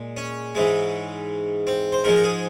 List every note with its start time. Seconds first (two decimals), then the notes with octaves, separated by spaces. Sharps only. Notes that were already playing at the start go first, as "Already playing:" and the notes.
Already playing: A#2 G#3
0.17 C#4
0.55 G#2 E3 G#3
1.67 C4
1.92 C5
2.04 G#2 F3 G#3 A#4
2.16 A#4
2.24 G#4